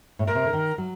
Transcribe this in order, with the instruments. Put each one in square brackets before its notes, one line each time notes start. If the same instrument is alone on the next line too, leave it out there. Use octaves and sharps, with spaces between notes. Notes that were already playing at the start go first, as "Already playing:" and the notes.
[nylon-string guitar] A2
[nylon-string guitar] A#2 [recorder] A#4
[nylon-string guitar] C3
D3
D#3
F#3